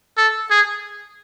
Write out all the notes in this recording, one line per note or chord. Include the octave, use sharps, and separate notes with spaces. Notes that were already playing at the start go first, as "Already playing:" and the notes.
A4
G#4